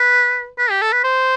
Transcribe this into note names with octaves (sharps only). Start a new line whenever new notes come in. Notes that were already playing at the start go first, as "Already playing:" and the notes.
Already playing: B4
B4
G4
A4
B4
C5